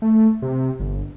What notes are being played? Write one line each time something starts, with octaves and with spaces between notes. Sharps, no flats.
A3
C3
G1